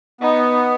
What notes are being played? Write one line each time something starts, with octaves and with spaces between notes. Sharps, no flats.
B3 D#4